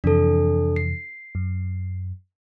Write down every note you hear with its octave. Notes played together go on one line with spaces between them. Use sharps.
F2 C3 E3 D4 A4
C7
F#2